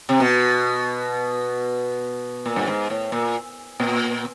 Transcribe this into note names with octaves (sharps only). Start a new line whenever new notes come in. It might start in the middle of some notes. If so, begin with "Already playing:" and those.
C3
B2
A#2
G2
G#2
A2
A#2
A#2